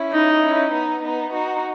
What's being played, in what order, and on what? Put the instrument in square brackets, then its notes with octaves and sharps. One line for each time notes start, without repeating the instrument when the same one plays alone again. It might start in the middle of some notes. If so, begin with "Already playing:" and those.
Already playing: [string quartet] C#4 E4
[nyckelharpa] D#4
[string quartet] C#4 E4
B3 D#4
B3 D#4
D#4 F#4